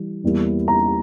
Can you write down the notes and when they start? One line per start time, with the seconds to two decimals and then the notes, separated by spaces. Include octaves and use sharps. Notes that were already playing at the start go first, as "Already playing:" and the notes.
Already playing: E3 G3
0.24 E2 E3 G3 A#3 E4
0.68 A#5